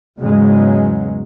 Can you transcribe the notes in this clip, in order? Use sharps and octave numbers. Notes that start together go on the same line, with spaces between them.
E2 G#2 C#3 F#3 G#3